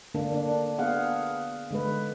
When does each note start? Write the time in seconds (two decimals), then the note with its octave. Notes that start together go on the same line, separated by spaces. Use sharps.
0.14 D3 A#3 D4
0.34 D4
0.78 B3 G#4 F5 F#5
1.71 D3 G#3 B4